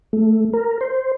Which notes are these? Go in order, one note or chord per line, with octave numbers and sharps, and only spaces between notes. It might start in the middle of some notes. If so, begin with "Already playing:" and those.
A3
A#4
C5